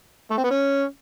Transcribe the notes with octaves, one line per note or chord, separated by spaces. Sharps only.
A3
C4
B3
C#4